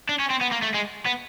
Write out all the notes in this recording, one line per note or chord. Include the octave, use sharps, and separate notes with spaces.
D4
C#4
C4
B3
A#3
A3
G#3
B3